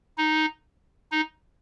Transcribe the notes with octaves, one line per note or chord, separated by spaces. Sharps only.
D#4
D#4